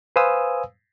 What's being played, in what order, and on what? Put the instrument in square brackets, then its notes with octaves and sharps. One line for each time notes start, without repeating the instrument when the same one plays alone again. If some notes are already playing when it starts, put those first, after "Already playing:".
[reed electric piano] B4 C5 F5 G#5 D#6 E6